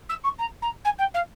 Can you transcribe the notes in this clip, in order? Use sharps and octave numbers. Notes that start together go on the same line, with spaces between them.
E6
C#6
A#5
A#5
G#5
G5
F5